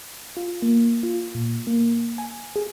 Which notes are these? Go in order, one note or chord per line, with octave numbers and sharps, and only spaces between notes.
F4
A#3
F4
A#2
A#3
G#5
G#4